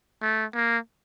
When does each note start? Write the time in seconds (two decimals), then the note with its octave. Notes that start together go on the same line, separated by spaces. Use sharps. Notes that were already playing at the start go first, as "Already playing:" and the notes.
0.22 A3
0.55 A#3